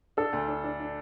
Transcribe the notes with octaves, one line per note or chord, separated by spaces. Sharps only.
D4 A4
D2
D4
D4
D4